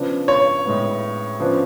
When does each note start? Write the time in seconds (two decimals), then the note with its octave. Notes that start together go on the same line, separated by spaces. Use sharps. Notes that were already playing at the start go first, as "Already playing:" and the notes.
Already playing: C#3 F3 B3 D4
0.28 C#5
0.66 A2 G#3 B3
1.40 C#3 F3 B3 D4